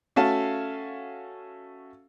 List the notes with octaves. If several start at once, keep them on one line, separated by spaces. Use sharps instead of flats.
A3 C#4 F#4 F5 A5